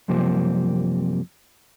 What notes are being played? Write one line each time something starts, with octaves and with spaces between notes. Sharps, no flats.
F#2 C3 F3 G3 A#3 C4